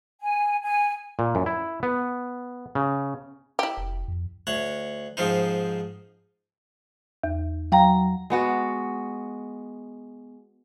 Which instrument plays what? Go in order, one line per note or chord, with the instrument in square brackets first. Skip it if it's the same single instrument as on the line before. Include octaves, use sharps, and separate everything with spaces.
[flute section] G#5
G#5
[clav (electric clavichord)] A#2
F#2
E4
B3
C#3
[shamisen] E4 G4
[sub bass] F1
F2
[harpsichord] D2 C#5 F#5
G#2 F3 C4 D#4
[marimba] E2
[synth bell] F#3 A#5 [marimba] F5 G5
[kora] G#3 B3 F#4